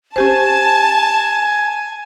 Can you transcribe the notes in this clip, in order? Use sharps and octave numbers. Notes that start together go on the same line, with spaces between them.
C#4 G4 C5 G#5 A5